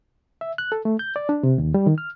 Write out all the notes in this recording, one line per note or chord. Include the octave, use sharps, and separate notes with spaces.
E5
F#6
A4
A3
G6
D5
D4
C3
D#2
G3
D#3
F6